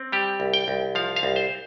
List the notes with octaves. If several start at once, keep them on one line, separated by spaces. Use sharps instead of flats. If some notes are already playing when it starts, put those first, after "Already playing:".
Already playing: C4
G3 G4
C2
G5
C2
F3 F5
F5
C2
C5